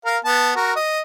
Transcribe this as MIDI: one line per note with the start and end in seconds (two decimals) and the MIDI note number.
0.05 0.17 70
0.05 0.17 77
0.25 0.51 59
0.25 0.51 81
0.56 0.73 66
0.56 0.73 70
0.76 1.01 75